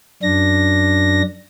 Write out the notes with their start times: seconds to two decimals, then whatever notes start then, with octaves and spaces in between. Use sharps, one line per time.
0.23 F#2 D4 A#6